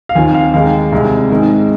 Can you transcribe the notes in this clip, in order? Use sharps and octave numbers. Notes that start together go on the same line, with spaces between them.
F5
D#2 D#3 C4 F4 G#5
F5
D#2 D#3 G#3 F5
C2 C3 G#3
G#2 D#3 G#3 C4 D#4